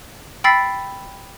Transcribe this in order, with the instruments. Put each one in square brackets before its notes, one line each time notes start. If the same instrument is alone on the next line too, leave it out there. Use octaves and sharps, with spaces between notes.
[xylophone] G5 B5 E6 A6 B6 C7